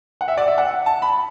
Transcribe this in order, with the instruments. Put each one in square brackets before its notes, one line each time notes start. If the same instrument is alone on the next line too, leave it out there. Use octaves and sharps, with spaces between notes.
[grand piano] F#5
E5
D5
E5
F#5
A5
B5